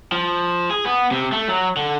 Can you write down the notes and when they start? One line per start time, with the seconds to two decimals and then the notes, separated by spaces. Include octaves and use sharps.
0.12 F3
0.70 G#4
0.85 B3
1.11 C3
1.32 A3
1.48 F#3
1.77 D3